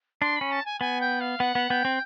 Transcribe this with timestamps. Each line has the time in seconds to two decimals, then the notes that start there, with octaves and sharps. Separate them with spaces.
0.21 D4 C6
0.36 B5
0.41 C#4
0.51 A5
0.65 G#5
0.81 B3 G#5
1.01 G5
1.20 F5
1.40 B3 F#5
1.55 B3
1.70 B3 G5
1.85 C4